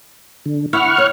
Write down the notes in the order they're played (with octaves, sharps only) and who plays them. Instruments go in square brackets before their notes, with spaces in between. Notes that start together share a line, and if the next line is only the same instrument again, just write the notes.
[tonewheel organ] D3
[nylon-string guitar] E4 [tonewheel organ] F#5 C#6 F6
[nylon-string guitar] C#5